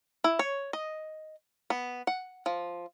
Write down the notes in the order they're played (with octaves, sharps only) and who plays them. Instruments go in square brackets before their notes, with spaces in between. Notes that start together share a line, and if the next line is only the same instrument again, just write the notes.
[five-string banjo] E4
C#5
D#5
B3
F#5
F3